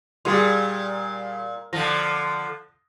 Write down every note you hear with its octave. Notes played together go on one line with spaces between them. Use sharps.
A#2 G3 G#4 C6
D3 F3 A#6